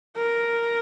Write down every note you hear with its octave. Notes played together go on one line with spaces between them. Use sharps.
A#4